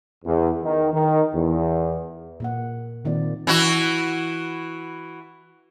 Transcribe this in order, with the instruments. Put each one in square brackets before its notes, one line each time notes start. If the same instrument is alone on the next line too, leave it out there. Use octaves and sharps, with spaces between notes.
[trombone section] E2
D#3
D#3
E2
[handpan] A#2 A#3 F#5
A#2 D#3 A#3 C4 F4 D5
[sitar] E3 E4 F#4